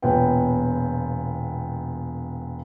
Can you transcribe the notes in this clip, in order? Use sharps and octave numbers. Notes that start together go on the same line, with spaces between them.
E1 A#2 B3 G5